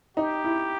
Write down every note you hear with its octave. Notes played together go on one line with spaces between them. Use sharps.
D#4 G4
E4